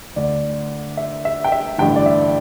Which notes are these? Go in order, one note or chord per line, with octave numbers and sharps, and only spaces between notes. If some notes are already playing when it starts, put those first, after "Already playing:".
D2 D3 D5
E5
E5
G5
E5
A1 G2 D3 G5
D5
E5